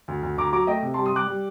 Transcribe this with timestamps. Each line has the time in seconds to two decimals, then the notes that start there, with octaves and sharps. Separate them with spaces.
0.08 D2
0.23 D2
0.38 D2 A#5 D6
0.53 F#3 A#5 D6
0.67 A3 D#5 G5
0.83 C3
0.94 A5 C6
0.98 G3
1.06 C6 D#6
1.13 G3 D6 F#6
1.27 G3